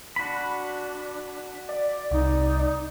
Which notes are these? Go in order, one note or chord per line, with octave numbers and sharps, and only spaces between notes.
D4 F#4 B5
D5
C2 D#4